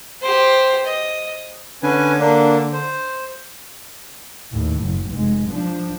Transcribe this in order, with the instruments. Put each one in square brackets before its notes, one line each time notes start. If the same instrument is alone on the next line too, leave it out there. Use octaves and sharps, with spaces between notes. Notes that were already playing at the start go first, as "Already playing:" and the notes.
[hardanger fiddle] G4 C5
D#5
[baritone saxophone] D3 [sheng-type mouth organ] C#4 B4 G#5
[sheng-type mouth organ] A#3 D4
C5
[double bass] D#2 A2
F#1
F1 G#3
F3 D4